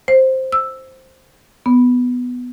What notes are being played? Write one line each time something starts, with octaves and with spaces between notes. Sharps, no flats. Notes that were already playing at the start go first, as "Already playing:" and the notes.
C5
E6
B3